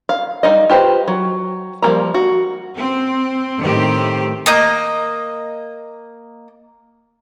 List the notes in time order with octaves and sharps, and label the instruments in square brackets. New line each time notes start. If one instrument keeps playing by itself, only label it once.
[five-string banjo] F5
G3 D#4 D#5
F4 G4 B4 C5
F#3
F3 G3 G#3 A#3 A#5
F#4
[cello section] C4
A2 D#3 C4 G4
[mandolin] A#3 D#5 G6